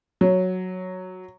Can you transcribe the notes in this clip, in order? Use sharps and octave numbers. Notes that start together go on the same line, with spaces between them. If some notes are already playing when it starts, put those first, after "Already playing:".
F#3